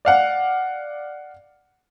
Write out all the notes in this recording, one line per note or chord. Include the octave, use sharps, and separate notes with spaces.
D5 F5 F#5